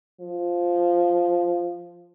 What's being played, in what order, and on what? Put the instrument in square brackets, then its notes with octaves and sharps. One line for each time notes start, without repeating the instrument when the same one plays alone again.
[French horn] F3